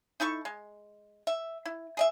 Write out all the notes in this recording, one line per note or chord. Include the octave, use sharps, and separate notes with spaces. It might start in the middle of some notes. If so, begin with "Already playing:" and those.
D#4 E4 A4 C#6
G#3
E5
E4
G#4 D#5 E5